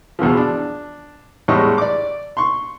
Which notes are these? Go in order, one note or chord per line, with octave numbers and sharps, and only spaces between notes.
E2 B2 E3 F3
D4
E2 A2 G3 G#3 D#5 C#6
D5 D6
C6 C#6